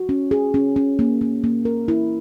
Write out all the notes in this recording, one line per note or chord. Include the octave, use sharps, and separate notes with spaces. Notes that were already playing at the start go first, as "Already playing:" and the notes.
Already playing: F#4
C#4
G#4
C#4
C#4
A#3
A#3
A#3
A#4
E4